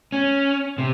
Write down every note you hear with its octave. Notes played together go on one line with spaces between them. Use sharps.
C#4
C3